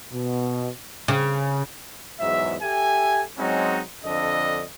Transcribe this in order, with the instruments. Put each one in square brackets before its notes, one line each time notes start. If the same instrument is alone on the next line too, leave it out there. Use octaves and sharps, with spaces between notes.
[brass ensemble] B2
[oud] C#3
[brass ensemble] E2 G#2 F#3 E5
G4 A4 E5 G#5
F#3 G#3 C4 C#4 D#4 F#4
F2 D3 D4 A4 D#5